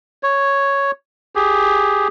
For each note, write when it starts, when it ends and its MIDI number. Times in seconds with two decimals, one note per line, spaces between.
0.23 0.91 73
1.35 2.08 67
1.35 2.08 68